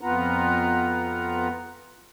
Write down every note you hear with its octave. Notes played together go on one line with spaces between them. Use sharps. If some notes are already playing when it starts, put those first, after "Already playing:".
F2 B3 F4 B4 F#5 A#5